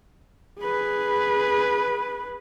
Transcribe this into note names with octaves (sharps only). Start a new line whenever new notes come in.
G#4 B4